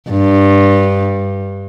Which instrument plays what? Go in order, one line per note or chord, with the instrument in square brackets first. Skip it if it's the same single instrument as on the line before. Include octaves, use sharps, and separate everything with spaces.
[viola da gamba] G2